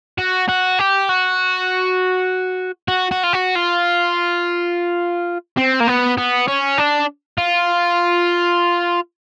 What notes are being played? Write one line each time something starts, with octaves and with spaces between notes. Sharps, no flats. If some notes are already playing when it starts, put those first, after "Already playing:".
F#4
F#4
G4
F#4
F#4
F#4
F4
F#4
F4
C4
A#3
B3
B3
C#4
D4
F4